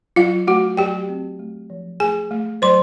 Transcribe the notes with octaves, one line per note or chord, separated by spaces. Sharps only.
F#3 F4 F5
A3 F#4 F#5
F#3 G4 G5
C4
A3
F3
A3 G#4 G#5
A3
F#3 C5 C6